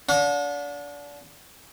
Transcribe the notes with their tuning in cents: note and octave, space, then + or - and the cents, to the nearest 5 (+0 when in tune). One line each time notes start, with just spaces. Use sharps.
D4 -30 F#5 -45